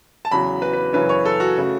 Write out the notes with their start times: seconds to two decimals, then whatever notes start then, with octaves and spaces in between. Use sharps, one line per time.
0.25 A5
0.31 E2 C#3 F#3 B5
0.62 B4
0.73 B4
0.93 F#2 C#3 E3 C#4 B4
1.09 C#5
1.25 A4
1.40 F#4
1.58 C#3 A3